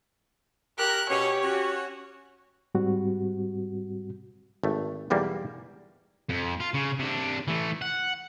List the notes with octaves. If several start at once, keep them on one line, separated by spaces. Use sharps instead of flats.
G4 A#4 F#6
B2 C#4 G4 C#5
C#4 F#4
G#2 G3 C4 F#4
G#1 A3
B1 E2 G3 A#3
F2
F4
C#3
C3 D4
E3 A3
F#5